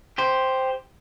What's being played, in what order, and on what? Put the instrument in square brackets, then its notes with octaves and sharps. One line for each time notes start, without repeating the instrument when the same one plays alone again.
[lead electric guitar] G4 C5